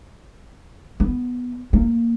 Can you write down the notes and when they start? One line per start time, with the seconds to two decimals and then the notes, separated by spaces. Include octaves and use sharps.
1.00 B3
1.73 A#3